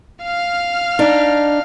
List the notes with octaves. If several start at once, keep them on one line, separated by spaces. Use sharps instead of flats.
F5 F6
D4 D#4